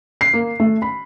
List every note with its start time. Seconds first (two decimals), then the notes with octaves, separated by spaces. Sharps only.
0.21 C7
0.34 A#3
0.60 A3
0.82 B5